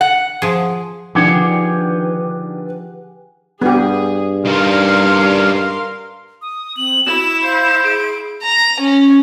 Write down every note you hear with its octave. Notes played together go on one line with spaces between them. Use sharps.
F#5
F3 G#4
D3 D#3 F3 G4 G#4 B4 F#5 D6
G2 B3 G4 G#4
G3 D#4 A#4 F5 C6
D#6
C4 F#7
E4 F#4 E7
C5 F5 E7
G#4 D7
A#5
C#4